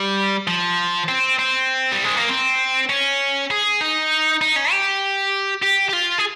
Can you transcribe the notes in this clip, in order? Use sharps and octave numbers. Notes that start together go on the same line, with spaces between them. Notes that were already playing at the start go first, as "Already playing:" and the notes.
Already playing: G3
F3
C4
C4
G3
G#3
A#3
C4
C#4
G#4
D#4
D#4
C#4
G4
G4
G4
F4
G#4